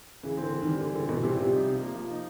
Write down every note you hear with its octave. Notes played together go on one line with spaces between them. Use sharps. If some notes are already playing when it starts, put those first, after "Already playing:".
C#3 E3
C4
D3
E3
D#3
G3
D3 E3
D3 C4
B2 E3
C3 G3
C3 F3
D#4
F3
A#3
F3
D#4